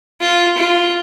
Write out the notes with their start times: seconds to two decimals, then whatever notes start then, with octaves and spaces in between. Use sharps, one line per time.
0.21 F4
0.57 F4